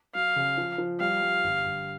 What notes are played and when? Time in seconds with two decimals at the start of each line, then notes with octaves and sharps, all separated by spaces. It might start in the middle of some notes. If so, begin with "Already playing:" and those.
0.15 F#3 F5
0.36 C#3
0.58 F3
0.78 F3
1.00 G3 F5
1.22 G3
1.44 G1
1.65 G1